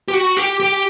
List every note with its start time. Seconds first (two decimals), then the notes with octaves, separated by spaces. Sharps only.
0.08 G4
0.14 F#4
0.37 G4
0.60 G4